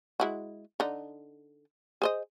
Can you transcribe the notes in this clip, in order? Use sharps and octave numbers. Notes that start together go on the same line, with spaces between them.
G#3 E4 F#4
D3 D#4
G#4 C5 D#5